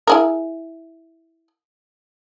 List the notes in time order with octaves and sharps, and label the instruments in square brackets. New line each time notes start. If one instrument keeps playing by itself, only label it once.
[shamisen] E4 G#4 A#4